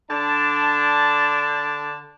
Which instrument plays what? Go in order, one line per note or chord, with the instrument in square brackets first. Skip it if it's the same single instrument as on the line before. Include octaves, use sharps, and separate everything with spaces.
[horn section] D3 D4 A5